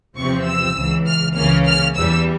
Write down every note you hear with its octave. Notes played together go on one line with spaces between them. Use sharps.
E2 C3 F3 C4 C#6
E6
C#2 C#3 E3
F6
C#2 C#3 E3 A#3 C#4 F6
F6
E2 E3 G3 E6